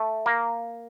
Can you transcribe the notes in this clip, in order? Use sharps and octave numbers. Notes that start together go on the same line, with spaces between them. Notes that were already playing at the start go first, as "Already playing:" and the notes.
Already playing: A3
A#3